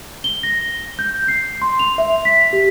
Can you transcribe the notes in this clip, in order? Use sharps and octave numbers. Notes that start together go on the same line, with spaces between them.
G7
A#6
G6
C7
C6
F7
E5
B6
G4